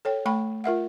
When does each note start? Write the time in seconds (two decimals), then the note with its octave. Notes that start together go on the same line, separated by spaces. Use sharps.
0.05 A4 C#5 G5
0.26 A3 G5 B5 C#6
0.64 F4 A#4 E5 F#5